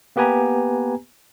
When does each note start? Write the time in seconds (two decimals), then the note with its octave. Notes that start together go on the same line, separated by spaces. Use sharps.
0.16 A#3 B3 G4 B4 G#5 A#5